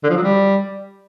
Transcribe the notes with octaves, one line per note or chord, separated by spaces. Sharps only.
D3
F3
F#3
G3